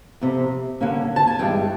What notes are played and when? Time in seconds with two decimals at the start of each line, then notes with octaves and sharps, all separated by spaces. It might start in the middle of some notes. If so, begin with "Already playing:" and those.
0.21 F2 C3
0.81 D3 G3 A#3 C#4
1.16 A5
1.27 G#5
1.39 G2 E3 G#3 G5